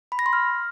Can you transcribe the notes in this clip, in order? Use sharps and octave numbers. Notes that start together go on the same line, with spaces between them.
B5
A#6
C6
F6